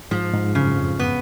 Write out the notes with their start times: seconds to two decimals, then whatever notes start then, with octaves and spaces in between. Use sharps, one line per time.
0.11 G#2 F3
0.34 G#2
0.55 F#2 C#3
0.77 F2
0.99 B3